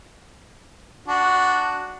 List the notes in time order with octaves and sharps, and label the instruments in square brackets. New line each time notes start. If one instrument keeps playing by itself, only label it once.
[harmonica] D4 F#4